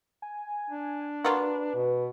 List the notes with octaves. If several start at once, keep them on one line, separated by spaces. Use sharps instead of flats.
G#5
D4
A#3 F4 F#4 B4
B2